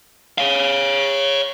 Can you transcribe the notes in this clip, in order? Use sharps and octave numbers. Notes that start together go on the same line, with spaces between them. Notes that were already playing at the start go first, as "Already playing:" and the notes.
C#5 F5